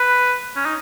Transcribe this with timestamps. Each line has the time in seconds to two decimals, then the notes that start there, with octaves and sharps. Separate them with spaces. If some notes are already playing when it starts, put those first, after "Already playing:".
Already playing: B4
0.56 C#4
0.65 D#4